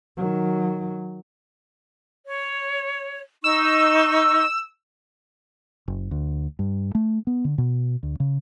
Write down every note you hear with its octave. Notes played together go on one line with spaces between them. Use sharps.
D#3 F#3
C#5
D#4 C#6 E6
F#1
D2
G2
A3
B3
D3
B2
D2
C#3